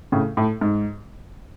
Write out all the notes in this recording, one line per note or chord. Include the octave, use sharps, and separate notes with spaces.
A2 C#3
A2
G#2